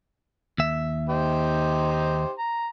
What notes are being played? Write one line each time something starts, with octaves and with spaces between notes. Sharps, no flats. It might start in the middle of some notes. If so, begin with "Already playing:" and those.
D#2 E5
D#4 G4 C5
A#5